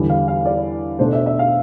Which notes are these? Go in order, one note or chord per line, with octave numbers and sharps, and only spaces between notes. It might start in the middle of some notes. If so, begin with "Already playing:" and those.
Already playing: E2 D3 G3 B3
F5
F5
D5
B2 A3 D4 C5
E5
E5
F5